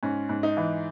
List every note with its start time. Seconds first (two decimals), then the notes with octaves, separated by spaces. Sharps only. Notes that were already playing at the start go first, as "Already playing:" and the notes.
0.03 G#2 C#4
0.29 G#2
0.43 D#4
0.57 E3